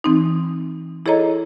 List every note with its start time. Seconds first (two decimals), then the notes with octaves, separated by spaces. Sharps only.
0.04 E3 C4 D#4
1.06 E4 G#4 A4 C#5 D#5 A#5